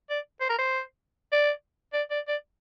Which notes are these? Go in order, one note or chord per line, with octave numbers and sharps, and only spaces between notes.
D5
C5
A#4
C5
D5
D5
D5
D5